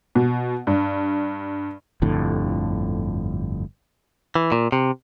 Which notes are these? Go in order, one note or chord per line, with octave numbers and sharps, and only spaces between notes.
B2
G2
G1 F2 A2 D3
E3
A#2
C3